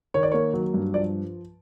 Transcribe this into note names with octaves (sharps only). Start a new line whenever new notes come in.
D#3 C#5
D5
A#3 C#5
F#3
G2
F3 D5